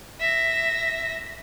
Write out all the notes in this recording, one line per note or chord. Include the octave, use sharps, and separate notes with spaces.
E5 A#6